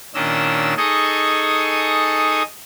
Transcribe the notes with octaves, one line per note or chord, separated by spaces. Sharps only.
A#2 D#3 C#4 D4 D#5 E6
D#4 G#4 A4 D#5 C#6 D#6